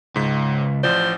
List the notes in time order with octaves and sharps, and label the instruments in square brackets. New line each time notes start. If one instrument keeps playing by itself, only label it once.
[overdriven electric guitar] C#2 [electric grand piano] G#2 B6
[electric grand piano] A1 F3 D5 [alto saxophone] C5